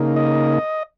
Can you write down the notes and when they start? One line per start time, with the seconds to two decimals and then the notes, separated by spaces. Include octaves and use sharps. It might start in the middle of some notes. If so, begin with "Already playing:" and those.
Already playing: C#3 A#3 D#4
0.16 D#5